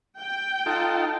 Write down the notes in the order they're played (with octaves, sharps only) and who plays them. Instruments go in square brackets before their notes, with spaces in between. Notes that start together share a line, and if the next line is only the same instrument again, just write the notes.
[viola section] G5
[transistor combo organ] D#4 F4 A4